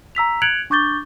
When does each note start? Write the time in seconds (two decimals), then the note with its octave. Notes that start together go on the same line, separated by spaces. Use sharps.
0.15 A#5 E6 B6 F7
0.42 F#6 G#6 C#7 D7 F7 F#7
0.70 D4 C#6 D6 G6 A6 G7